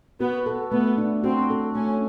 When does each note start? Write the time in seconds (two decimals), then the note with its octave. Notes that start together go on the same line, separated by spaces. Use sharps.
0.20 B3 F#4
0.46 A4
0.72 A3 B3
0.98 D4
1.24 C4 F#4
1.50 A4
1.75 A3 C#4